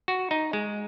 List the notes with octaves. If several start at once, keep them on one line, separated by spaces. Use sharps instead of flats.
F#4
D#4
G#3